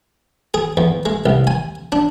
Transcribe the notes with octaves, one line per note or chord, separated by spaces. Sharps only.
G#4
E2
G#3
C2
G#5
D4